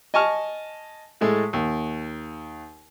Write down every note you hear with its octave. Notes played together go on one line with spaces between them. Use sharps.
D#5 G#5 A5 C#6 F6
A2 G#3 A3
D#2